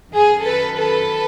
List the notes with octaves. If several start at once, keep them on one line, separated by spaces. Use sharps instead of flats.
F#2 D#3 G#4
A4 B4
A4 B4